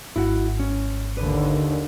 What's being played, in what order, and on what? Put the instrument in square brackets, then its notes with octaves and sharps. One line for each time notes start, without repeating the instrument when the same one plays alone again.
[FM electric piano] G#1 G#2 [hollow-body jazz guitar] E4 F#4 F#5
[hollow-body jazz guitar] C#4
[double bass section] D#2 D3 [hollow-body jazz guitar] B4